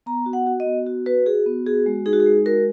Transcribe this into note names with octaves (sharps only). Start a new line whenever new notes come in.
B3 A#5
F#4
F#5
F#4
D#5
B3
F#4
F#4 B4
F#4 G#4
B3
F#4 G#4
G#3
D#4 G#4
F#4
G#4
G#3
F#4 A#4